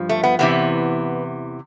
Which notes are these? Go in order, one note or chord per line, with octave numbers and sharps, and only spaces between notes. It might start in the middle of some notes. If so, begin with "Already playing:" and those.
Already playing: G2 F3
A3
B3
E2 C3 E3 B3